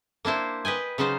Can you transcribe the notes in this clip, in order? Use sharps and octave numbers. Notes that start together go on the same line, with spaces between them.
A#3 D4 E4 C5
B4 D#5 G5 G#5
C#3 F#3 D#4 F4 C5